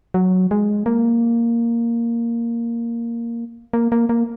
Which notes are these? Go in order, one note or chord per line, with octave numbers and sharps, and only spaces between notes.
F#3
G#3
A#3
A#3
A#3
A#3